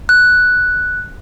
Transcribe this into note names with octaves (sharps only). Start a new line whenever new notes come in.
F#6